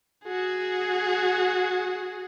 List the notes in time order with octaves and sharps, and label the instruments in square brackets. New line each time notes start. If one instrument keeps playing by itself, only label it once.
[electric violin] F#4 G#4